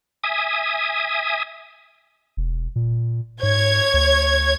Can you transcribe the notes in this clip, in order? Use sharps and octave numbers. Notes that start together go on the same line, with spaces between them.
E5 G#5 D#6
E1
A#2
G#2 C#5 G#6
D2